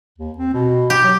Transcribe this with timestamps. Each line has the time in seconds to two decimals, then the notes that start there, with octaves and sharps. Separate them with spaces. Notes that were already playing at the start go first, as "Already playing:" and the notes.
0.18 D#2
0.38 C4
0.54 B2
0.90 G4
1.04 F#3